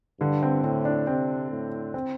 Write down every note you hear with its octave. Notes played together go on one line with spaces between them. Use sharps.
G2 D3
C4
A2 C4
D4
C3 C4
A2
C4